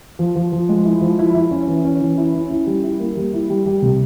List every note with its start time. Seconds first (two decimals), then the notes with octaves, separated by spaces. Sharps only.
0.19 F3
0.36 F3
0.52 F3
0.69 G#3
0.85 E4
1.01 F3
1.19 E4
1.35 E4
1.51 C#4
1.68 E3
1.85 C#4
2.01 E3
2.18 E4
2.35 C#4
2.51 E4
2.67 G3
2.84 E4
3.00 A#3
3.17 G3
3.33 E4
3.50 G3
3.66 G3
3.82 C3